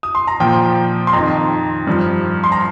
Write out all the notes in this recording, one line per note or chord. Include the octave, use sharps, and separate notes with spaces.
D#6
C6
A#5
A#2 F3 G5
C6
F2 D#3 A#5
G2 F3
C6
A#5